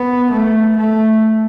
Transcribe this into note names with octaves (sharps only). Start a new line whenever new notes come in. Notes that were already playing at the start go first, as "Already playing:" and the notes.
Already playing: B3
A3
A3